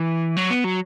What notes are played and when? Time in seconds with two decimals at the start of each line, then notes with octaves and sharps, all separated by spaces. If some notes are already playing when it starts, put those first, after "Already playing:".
Already playing: E3
0.37 F#3
0.50 B3
0.64 F#3